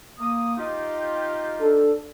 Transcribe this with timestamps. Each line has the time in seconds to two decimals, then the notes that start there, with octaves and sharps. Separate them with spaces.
0.19 A#3 D#6
0.57 D#4 F4 G4
1.60 D4 A4